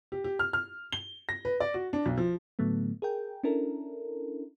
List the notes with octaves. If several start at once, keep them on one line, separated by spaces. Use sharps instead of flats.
G4
G4
F6
F6
G7
A#6
B4
D5
F#4
D4
B1
F3
A2 D3 F#3 A3 B3
G#4 A#4 G5
C#4 D4 E4 A4 A#4